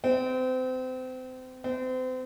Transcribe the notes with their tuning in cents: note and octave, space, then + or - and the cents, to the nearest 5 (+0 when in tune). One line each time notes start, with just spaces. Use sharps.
C4 -30
C4 -35